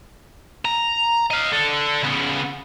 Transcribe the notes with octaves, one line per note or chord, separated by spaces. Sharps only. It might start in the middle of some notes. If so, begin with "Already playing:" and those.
A#5
D#5 F5
D3 A4
C#3 B3